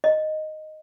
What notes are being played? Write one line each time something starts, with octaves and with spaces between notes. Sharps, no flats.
D#5